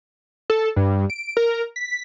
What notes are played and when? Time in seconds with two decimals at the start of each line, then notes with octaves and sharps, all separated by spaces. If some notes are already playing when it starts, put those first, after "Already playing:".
0.50 A4
0.76 G2
1.10 D7
1.37 A#4
1.76 B6